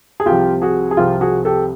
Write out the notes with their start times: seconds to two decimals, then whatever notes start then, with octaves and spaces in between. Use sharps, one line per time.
0.20 G#4
0.26 C2 C3 F3 F4 G4
0.62 F#4 G#4
0.91 G#4
0.97 C2 C3 F3 F4 G4
1.21 F#4 G#4
1.45 G4 A4